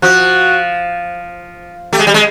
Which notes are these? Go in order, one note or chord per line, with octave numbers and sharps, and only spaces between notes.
F3 F#4
A3 G4
G#3
G3
G#3